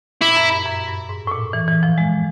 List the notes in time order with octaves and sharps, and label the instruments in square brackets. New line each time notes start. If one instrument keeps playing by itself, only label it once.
[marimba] A#2 [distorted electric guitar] E4
[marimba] F#2
G2
F#2
G2
G#2
A2
A#2
E3
E3
F3
G#3